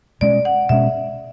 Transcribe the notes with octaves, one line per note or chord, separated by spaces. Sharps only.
B2 G#3 C#4 D5
F#5
B2 G#3 C#4 E5